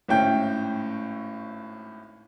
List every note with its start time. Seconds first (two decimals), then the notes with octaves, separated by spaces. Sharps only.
0.08 G#1 A2 C#4 G5 G6